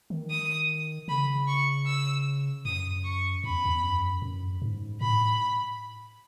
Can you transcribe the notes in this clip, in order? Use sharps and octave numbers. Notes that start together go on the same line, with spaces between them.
D#3
D#6
C#3 B5
C#6
E6
F#2 D#6
C#6
F#2 B5
E2
E2
F#2
F#2
G#2
A2 B5